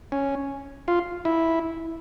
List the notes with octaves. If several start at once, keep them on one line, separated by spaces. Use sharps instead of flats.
C#4
F4
E4